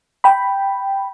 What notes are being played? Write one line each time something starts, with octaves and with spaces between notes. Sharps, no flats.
G5 B5